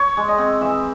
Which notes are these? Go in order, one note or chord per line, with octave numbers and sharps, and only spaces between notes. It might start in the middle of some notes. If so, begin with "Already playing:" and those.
Already playing: C#5
G#3
D#5
C4
E3 E5